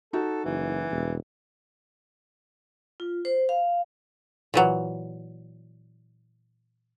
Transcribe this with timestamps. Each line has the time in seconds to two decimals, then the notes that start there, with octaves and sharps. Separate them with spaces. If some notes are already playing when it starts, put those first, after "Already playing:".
0.13 D#4 F#4 A4
0.45 F#1 E3
0.91 E1
3.00 F4
3.25 C5
3.49 F5
4.54 A#2 E3 F#3